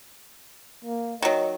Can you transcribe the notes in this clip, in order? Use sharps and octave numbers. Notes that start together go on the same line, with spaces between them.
A#3
D#3 F#3 D#5